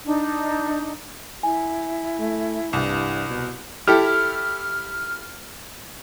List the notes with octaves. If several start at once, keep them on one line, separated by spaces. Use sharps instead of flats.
D4 D#4
E4 G#5
A3
C2 G2
B2
E4 G4 A4 F6